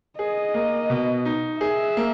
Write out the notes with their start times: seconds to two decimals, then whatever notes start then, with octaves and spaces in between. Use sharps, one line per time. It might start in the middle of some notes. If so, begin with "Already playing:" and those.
0.19 G#4 D#5
0.54 A#3
0.90 B2
1.25 D#4
1.60 G#4 E5
1.97 A#3